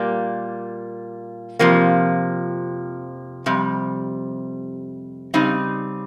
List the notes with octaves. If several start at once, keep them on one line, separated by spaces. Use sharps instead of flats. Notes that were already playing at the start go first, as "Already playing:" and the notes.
Already playing: A#2 G3 A#3
F2 C3 F3 A#3
F2 C3 G3
C#3 G3 C4 D#4